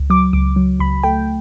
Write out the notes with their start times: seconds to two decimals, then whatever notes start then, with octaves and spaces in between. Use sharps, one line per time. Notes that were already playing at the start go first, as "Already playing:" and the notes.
Already playing: C#2
0.10 F#3 D6
0.33 C#2 D6
0.56 F#3
0.80 C#2 B5
1.03 A3 G5